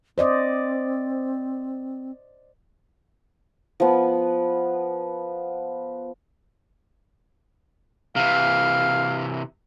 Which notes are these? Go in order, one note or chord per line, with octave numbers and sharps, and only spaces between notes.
C4 C5 D5 D#5
F3 B3
C3 E3 F5